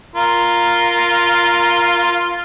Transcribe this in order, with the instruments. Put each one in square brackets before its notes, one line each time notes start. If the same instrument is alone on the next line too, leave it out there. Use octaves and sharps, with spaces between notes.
[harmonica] F4 A#4